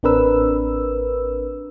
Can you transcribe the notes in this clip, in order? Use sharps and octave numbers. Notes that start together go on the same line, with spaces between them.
A1 C4 D4 A#4 B4 E6